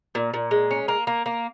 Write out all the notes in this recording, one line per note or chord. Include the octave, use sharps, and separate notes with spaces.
A#2
A#2
G#3
C#4
A#3
A#3
A#3